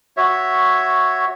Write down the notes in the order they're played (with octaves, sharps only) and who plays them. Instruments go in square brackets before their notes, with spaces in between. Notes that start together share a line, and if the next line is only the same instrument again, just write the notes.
[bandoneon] F#4 C#5 E5